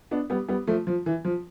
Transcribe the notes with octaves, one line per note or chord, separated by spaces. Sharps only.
B3 D4
G3 B3
G3 B3
F3 A3
F3
E3
F3